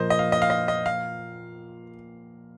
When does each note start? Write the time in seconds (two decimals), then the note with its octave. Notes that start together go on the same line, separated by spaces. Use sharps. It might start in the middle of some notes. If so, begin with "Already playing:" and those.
Already playing: A#2 F3 A#3 F4 C5 D#5
0.10 D#5
0.19 F5
0.32 D#5
0.42 F5
0.50 D#5
0.68 D#5
0.86 F5